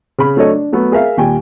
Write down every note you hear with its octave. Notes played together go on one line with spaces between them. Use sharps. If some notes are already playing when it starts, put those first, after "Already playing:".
C#3 B5
F#3 A3 D4 A4 C#5 D#5
D4
F#3 A3 B3
G#4 A#4 E5 F5
D#2 A#2 G3 G5 G#5